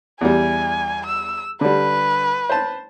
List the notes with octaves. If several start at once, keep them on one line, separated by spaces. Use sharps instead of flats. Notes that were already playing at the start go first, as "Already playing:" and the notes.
E2 G3 G#5
E6
D3 G3 B4
C5 A5